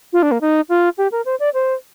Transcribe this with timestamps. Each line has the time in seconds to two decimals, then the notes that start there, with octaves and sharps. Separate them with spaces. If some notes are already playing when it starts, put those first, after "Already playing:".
0.13 F4
0.22 D4
0.31 A#3
0.41 D#4
0.69 F4
0.98 G4
1.12 A#4
1.25 C5
1.40 D5
1.54 C5